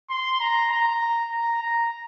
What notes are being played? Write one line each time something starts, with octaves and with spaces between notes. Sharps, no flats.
C6
A#5
A#5
A#5
A#5